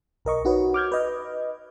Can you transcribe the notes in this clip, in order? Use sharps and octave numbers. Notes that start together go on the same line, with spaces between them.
B1 A#4 D#5 C#6
D#4 F#4 B4 C#5
D6 F6 G6 G#6
B4 D#5